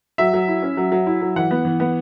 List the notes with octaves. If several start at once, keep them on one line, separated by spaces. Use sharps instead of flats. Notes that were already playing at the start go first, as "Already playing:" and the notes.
F#3 E5
F#3
E4
C#4
F#3
F#3
E4
F#3
E3 F#5
B3
E3
B3